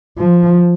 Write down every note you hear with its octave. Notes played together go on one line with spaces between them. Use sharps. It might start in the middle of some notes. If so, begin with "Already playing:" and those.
F3